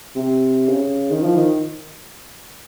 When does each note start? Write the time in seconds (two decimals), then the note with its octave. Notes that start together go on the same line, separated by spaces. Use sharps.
0.16 C3
0.68 C#3
1.10 D#3
1.22 F3
1.35 D#3